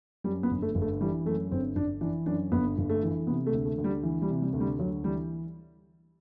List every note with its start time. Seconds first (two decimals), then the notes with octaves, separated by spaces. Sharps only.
0.24 F#2 G3
0.43 B3
0.51 G1
0.62 A3
0.75 G1
0.82 A3
1.01 E3 G3
1.25 F#2 A3
1.51 G1 C4
1.76 G1 D4
2.01 E3 D4
2.26 F#2 D4
2.52 G1 B3
2.78 G1
2.90 A3
3.03 E3
3.27 C3 B3
3.47 A3
3.52 D2
3.65 A3
3.78 D2
3.84 G3
4.03 E3
4.22 G3
4.29 C3
4.41 G3
4.53 D2
4.60 G3
4.79 D2 F#3
5.04 E3 G3